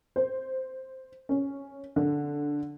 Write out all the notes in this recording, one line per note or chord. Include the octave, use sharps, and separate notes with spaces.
C5
C#4
D3